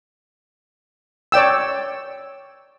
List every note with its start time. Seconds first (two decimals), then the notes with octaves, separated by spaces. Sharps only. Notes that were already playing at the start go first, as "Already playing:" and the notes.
1.32 C#5 D5 G5 E6